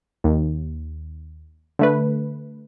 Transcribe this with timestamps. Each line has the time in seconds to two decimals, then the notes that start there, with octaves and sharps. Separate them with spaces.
0.24 D#2
1.79 D3 A3 B4